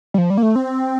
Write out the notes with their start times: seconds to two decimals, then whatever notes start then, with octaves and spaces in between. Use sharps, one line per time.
0.14 G3
0.18 F3
0.30 G3
0.38 A#3
0.43 A3
0.56 C4